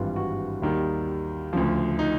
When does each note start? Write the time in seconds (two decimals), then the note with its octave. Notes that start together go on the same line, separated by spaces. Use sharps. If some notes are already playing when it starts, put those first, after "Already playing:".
Already playing: G#1 G2 E3 G3 F4
0.16 F#4
0.62 D#2 D#3 G3
1.53 D2 C#3 F3
1.99 D#4